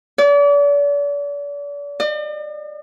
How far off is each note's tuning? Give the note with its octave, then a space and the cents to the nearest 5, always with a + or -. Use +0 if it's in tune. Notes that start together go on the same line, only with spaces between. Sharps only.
D5 -40
D5 +45